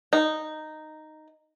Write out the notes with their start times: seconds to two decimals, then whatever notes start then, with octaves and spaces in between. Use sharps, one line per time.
0.13 D#4